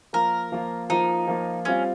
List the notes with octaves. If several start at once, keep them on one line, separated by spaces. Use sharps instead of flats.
F3 A#3 F4 A#4
F3 A#3 F4
F3 A#3 D#4 F4
F3 A#3 F4
G3 C4 C#4 F4